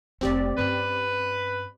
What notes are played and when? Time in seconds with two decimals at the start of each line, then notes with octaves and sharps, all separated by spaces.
0.21 F1 A3 C4 G4 D5
0.58 G2 C#4 B4